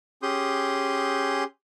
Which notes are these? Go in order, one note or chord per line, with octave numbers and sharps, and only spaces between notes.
C#4 G4 G#4 C6 D#6 G6